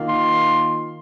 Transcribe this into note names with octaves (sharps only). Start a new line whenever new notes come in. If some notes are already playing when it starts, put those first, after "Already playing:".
Already playing: D#3 A#3 F4
C6